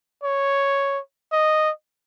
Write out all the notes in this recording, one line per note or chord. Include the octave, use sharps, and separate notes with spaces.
C#5
D#5